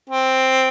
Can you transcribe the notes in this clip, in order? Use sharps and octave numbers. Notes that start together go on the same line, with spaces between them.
C4